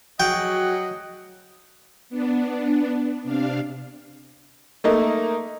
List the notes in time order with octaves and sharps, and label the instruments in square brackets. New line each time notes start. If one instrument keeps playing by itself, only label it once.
[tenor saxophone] F#3 [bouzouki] F#4 G#4 [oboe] D#5 [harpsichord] G5
[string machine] B3 D4
C3 D4 F5
[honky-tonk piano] A3 A#3 D#4